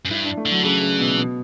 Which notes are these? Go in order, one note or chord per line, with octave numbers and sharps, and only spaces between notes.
F#2
G2 E4
D4
A3
D3
F#3
C#3 E3
C#3
B2
B2